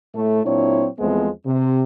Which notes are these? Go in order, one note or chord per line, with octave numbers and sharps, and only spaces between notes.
A2 A3
A#2 F#3 C4 D4 E4 C#5
E2 F3 G#3 A3 B3 C4
C3